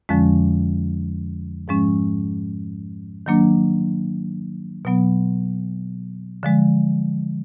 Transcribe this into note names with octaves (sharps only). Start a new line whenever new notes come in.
F2 D3 F3 G#3 C#4
G#2 F3 G#3 C#4
D#3 F#3 A#3 D4
B2 F#3 B3
D3 F3 G#3